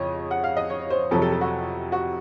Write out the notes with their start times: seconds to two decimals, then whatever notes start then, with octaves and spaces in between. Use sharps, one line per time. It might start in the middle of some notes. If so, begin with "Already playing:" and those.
Already playing: F2 C#3 C#5 D#5
0.31 F#5
0.44 F5
0.57 D#5
0.70 C#5
0.90 C5
1.11 F2 C3 F#3 A4
1.22 A4
1.32 A4
1.41 F#4
1.92 F#4